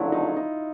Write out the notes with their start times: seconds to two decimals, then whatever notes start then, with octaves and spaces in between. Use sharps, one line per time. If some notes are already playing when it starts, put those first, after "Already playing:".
Already playing: F#1 F2 D3 F#3 A3 E4 F4
0.12 D#4
0.37 D#4